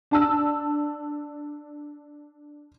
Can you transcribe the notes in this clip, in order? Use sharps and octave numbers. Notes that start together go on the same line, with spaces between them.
D4 A5 E6